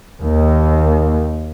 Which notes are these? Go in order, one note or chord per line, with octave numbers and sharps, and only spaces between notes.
D#2